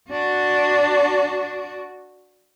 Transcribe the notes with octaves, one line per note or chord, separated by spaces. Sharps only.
D4 F#4